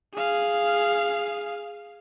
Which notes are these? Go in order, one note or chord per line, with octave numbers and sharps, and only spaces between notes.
G#4 F5